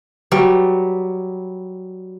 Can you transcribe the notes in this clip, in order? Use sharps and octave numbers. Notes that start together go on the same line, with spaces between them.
F#3 G3